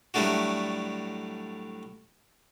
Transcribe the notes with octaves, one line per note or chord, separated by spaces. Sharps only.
A2 F#3 G3 A3 D4 F#4